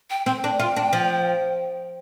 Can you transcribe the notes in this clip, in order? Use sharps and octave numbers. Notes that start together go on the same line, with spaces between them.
G5
C4 G5
D4
F4
D4
F3